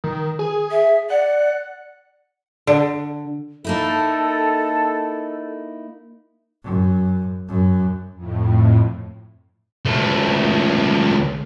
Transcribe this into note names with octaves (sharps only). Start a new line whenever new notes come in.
D#3
G#4
E5
D5 F#5
D3
A#3 D#4 E4 A4
F#2
F#2
F2 A2
C#2 A3